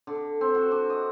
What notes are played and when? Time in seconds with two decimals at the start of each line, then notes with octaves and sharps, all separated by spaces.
0.07 D3
0.41 C4
0.55 F#4
0.71 D4
0.90 D#5